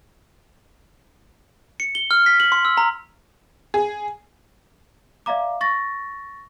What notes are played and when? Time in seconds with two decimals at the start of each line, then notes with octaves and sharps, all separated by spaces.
1.80 C#7
1.95 G7
2.11 F6
2.26 B6
2.40 F#7
2.52 C6
2.65 E6
2.77 A#5
3.74 G#4
5.26 D5 E5 F5 A#5 D6
5.61 C#6 A6 A#6